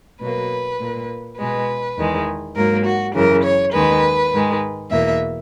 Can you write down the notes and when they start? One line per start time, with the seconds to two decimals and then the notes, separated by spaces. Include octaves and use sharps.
0.21 B2 F#3 A#3 B4
0.80 A#2 A#3
1.39 B2 G#3 B4
1.98 E2 D#3 G#3
2.56 G#2 F#3 A#3 A#4
2.86 F#4
3.15 F#2 C#3 E3 A#4
3.44 C#5
3.73 D#2 D#3 G#3 B4
4.32 G#2 D#3 G#3
4.91 E2 B2 A#3 E5